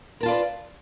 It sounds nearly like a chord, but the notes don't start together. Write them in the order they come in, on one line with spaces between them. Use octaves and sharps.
A#4 A5 F4 D5 B4